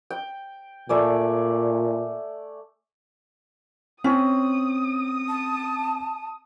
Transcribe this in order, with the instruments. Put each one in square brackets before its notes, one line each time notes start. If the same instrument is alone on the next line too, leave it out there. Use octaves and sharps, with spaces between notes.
[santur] G5
[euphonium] A#2 [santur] A3 D5 G#5
[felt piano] C4 [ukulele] C#4 [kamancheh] D#6
[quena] A5